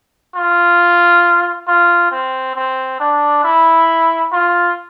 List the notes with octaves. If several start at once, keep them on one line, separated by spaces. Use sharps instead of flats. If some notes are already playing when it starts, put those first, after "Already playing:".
F4
F4
C4
C4
D4
E4
F4